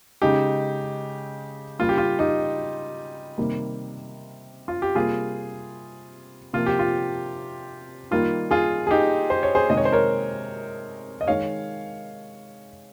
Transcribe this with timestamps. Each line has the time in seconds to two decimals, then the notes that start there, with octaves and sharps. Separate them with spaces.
0.22 C#3 G#3 D#4 G4
1.79 C#3 G3 A#3 F4
1.89 G4
1.98 F4
2.19 D#4 G4
3.38 C3 D#3 G3 A#3
4.68 F4
4.82 G4
4.95 C3 G3 A#3 F4 G#4
6.53 C3 F3 A#3 F4
6.66 G4
6.79 F4
8.11 D#3 G3 A#3 F4
8.51 F4 G#4
8.87 G#4
8.91 D#4 G4
9.30 C5
9.43 C#5
9.55 G#4 C5
9.70 C3 D#3 G#3 D#5
9.77 C#5
9.85 C5
9.92 A#4 C#5
11.21 D#5
11.27 D#3 G#3 C#5 F5